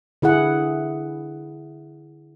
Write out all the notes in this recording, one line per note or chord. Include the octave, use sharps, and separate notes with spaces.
D3 E4 G#4 F#5